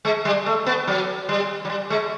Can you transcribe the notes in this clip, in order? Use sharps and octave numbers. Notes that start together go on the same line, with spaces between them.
G#3
G3
A3
B3
F#3
G3
F#3
G3
G#3